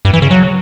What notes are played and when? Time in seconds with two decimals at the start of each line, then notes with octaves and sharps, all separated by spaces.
0.05 G2
0.13 E3
0.22 C#3
0.31 F#3